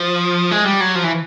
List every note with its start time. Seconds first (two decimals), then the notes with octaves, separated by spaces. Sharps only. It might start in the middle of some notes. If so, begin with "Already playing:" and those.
Already playing: F3
0.51 G#3
0.66 G3
0.80 F#3
0.95 F3
1.04 E3